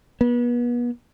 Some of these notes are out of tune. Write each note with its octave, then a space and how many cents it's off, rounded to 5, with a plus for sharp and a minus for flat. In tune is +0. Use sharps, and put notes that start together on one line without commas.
B3 -35